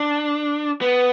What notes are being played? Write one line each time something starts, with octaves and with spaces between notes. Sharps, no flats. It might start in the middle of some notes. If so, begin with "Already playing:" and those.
Already playing: D4
B3